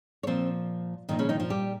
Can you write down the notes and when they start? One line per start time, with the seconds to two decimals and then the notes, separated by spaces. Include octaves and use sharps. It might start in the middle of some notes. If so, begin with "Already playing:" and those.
0.23 C#5
0.27 A#2 F3 C4 C5
1.09 A#2 D#3 F3 D#4
1.19 C#3 C#4
1.29 D#3 D#4
1.40 F3 F4
1.50 G3 G4